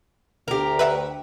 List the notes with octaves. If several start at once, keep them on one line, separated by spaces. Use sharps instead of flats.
D2 G4 A#4
B4 E5 F#5